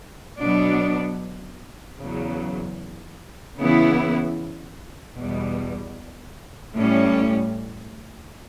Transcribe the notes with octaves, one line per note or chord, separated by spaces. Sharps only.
B2 F#3 B3 D4
E2 C#3 F#3
C#3 E3 B3 E4
E2 B2 G3
A2 G3 C#4